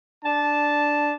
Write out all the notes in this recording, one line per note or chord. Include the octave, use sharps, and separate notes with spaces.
D4 A5